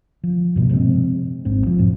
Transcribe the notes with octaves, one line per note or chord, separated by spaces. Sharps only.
F3
G2 B2 A#3
C3 F3 G#3 C4
G#1 G#2 C4
F3
F2 A2